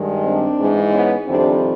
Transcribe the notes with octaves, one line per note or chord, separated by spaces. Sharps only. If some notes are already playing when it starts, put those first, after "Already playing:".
Already playing: G2 D#3 G#3
C4 D4
G#2 E3 G#3
B3 C#4
F2 C3 D#3 G3 C4 D4